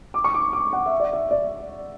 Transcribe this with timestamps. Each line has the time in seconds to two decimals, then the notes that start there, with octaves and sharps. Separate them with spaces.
0.14 D6
0.24 C#6
0.34 D6
0.53 D6
0.73 F#5
0.86 E5
1.00 D5
1.13 E5
1.31 D5